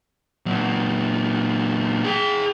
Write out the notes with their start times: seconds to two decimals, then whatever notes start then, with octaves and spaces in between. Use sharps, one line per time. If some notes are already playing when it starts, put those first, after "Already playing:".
0.46 A#2 F#3
2.04 G#4 G5